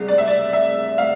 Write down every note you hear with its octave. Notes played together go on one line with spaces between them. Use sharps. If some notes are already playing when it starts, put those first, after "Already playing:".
Already playing: C2 C3 G#3
D5
E5
D5
E5
F5